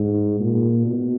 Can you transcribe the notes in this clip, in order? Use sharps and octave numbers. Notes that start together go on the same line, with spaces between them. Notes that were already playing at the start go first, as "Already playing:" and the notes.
Already playing: G#2
A#2
B2